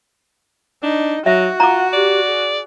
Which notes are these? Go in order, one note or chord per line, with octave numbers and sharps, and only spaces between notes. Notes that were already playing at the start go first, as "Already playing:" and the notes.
D4 D#4
F#3 F#4 E5
F4 F#5 A#5 D6
G4 D5
G#4